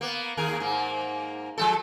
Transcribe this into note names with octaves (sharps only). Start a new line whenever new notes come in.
A#3 B3
D#2 G#4 A#4
G#2 A#3
F3 G#3 A4